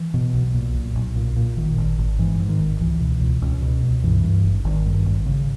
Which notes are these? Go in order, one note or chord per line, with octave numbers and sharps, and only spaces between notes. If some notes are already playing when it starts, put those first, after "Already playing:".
Already playing: E3
B2
B1
A#2
B1
B1
A#2
A#2
G#1 D#3
G#1
G#1
G#2 E3
G#2
D#3
G#1
C#2 E3
B2
C#2
C#2
B2
C#2
G2 E3
G2
G#1
G#1 D#3
G2
G#1
C#3